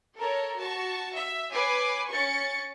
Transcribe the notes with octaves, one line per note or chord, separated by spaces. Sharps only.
A4 A#4 C#5
F#4 A5 C#6
E5
B4 C#5 G#5 D6 C7
C#4 C#6 A6 C#7